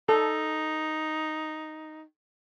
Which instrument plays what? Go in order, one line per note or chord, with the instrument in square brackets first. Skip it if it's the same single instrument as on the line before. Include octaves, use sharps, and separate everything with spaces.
[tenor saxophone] D#4 [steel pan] A4